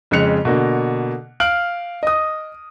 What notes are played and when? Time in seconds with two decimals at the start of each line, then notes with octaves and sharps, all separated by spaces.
0.11 F2 C#3 G#3 F#6 C#7 F7
0.45 B2 D3 A#3
1.40 F5 F6 D7 F#7
2.03 D#5 D#6